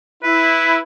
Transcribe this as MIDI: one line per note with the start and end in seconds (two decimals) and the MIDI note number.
0.24 0.83 64
0.24 0.79 71